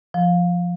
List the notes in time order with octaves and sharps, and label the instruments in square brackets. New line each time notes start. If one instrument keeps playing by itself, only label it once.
[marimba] F3